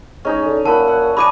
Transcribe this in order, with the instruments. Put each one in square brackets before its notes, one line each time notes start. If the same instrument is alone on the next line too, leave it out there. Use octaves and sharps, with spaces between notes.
[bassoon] G#3 [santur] C#4 D#4 G#4
[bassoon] D3
[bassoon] A#2 [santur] E5 F#5 B5 [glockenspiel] A5
[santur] F#5
[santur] D4 G#4 D#5 [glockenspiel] B5 D6 D#7